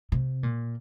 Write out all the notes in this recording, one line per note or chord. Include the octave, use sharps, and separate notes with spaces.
C3
A#2